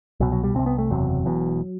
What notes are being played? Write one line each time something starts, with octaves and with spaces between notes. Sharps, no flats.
C2 B2 F#3
F#3
G3
C2 C3 C4
B3
A3
F#1 E2 C3 F#3
E1 E2 B2